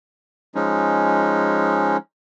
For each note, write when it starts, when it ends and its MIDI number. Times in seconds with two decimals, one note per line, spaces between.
0.55 1.97 53
0.55 1.97 56
0.55 1.97 61
0.55 1.97 63